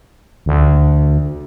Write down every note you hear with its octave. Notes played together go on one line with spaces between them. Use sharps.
D2